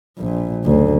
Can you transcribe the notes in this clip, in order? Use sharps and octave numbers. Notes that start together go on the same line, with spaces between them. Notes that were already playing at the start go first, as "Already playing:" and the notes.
A#1 A#2
F#1 D2